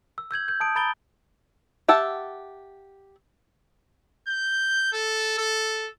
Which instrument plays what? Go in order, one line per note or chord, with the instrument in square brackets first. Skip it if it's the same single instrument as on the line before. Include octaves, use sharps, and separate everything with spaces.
[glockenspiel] E6
E6 G6 G#6 F#7
G6
A5 D#6 D7
A#5 B5 A6 D7 G7
[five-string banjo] G4 E5 F#5 A5
[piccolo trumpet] G6
A4
A4